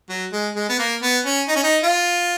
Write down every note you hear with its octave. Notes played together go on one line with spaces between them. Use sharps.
F#3
G#3
G#3
B3
A#3
B3
C#4
D#4
C#4
D#4
F4